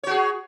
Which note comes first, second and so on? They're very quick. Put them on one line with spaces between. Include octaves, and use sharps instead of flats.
C#5 F#4 G#4